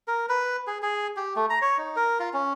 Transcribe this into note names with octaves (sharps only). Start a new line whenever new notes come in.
A#4
B4
G#4
G#4
G4
A3
A#5
C#5
D#4
A#4
F4
C#4